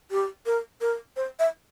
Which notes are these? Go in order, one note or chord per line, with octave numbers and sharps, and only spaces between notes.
G4
A#4
A#4
C5
E5